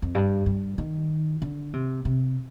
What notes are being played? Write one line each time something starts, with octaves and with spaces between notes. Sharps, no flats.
F2
G2
G2
D#3
D3
C3
C3